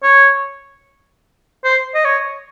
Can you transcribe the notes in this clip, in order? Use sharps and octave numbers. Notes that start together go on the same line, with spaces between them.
C#5
C5
D#5
C#5